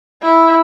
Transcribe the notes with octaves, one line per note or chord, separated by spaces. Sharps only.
E4